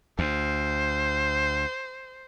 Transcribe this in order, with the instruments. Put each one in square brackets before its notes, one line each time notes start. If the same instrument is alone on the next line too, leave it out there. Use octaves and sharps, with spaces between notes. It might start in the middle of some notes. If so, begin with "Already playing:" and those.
[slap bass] D2 [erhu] C5